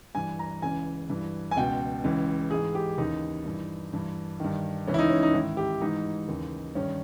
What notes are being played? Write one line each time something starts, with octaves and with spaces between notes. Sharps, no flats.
G2 E3 G#5
A#5
C#2 C#3 E3 G#5
G2 E3
G#5
C#2 B2 G5
C#2 C#3 E3
G#2 E3 G#4
G4
D#2 C#3 E3 D#4
G2 E3
G2 E3
G2 D#3
C#2 C#3 E3 C#4
E4
D#4
C#4
D#4
G#2 D#3 E4
G4
G#2 E3 D#4
D#2 C#3 E3
G2 D#3 C#4